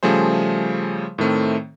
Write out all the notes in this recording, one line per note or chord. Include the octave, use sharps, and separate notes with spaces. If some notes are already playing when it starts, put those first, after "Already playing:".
C#3 F3 G3 A3 G#4 C5
A2 D#3 A3 C4